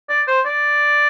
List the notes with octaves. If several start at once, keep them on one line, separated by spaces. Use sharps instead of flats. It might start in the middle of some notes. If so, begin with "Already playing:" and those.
D5
C5
D5